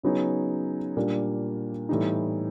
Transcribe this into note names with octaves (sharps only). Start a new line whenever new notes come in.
C#3 F#3 B3 D#4 G#4
A#2 G3 A#3 D4
A2 E3 G3 B3 D#4